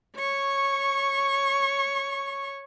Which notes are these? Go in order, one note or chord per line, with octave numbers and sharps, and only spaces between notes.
C#5 C#6